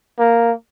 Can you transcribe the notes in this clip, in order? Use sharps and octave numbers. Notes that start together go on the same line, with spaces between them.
A#3